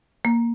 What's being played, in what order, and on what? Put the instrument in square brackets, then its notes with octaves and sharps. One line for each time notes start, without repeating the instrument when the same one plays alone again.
[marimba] A#3